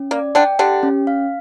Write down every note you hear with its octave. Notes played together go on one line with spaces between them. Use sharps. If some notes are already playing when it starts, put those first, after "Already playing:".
Already playing: C#4
A#3 D5
D3 D4 G5
D3 D4 G4
C#4
F5